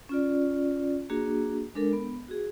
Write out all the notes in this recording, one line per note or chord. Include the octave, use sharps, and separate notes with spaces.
C#4 F4 D5
A#3 D4 F#4 G#4
G#3 D4 A4 A#4
B3
F#4 G#4